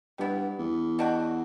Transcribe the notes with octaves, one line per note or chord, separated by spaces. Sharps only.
G2 G3 B3 E4
E2
B2 G3 D4 F#4